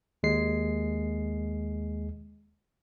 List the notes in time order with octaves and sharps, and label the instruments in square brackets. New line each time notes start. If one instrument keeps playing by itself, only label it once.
[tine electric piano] D#2 G#3 C7